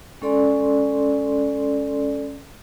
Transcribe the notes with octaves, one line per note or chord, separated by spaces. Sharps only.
G#3 C#4 A4 D5 C6